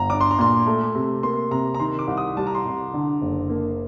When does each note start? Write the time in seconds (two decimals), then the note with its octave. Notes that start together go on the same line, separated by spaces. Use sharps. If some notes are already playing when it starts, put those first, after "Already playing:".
Already playing: G1 A#5
0.10 D4 D6
0.21 C6
0.31 A#5
0.38 A#2 C6
0.66 A3
0.95 C3
1.23 A#3 C6
1.51 C3 A#5
1.74 A#5
1.80 D#3 C6
1.99 D6
2.07 C2
2.17 D#6
2.37 G3 A5
2.47 A#5
2.55 C6
2.65 C2
2.94 D3
3.21 F#1
3.50 A#3